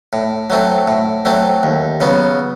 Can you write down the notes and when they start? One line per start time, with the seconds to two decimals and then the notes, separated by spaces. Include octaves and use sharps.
0.13 A2
0.50 F#3 A3 C4
0.88 A2
1.25 F#3 A3 C4
1.63 D#2
2.01 C#3 F#3 B3